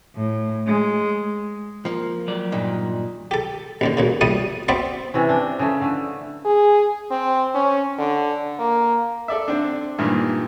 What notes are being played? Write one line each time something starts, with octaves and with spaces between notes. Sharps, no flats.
A2
G#3
F3 A#3
F#3 D5
G2 A#2 D#3
G4 A4
A1 D#2 D3
B1 A#2 C#3
A#1 E2 G3 A3 A5 D#6
B3 C4 F#4 C5 D5 E5
C3 E3 C#4
D4
C#3 A3
D3 A3
G#4
C4
C#4
D3
A#3
A4 D5 E5
D3 C4 D4
G2 A#2 D#3 E3